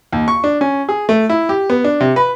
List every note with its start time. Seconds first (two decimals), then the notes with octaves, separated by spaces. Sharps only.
0.13 D#2
0.28 C#6
0.44 D4
0.61 C#4
0.89 G#4
1.09 A3
1.30 E4
1.49 G4
1.70 B3
1.84 D4
2.00 C3
2.16 B4